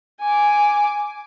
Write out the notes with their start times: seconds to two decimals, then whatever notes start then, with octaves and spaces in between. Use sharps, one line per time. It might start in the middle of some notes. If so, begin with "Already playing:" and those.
0.21 G#5 D6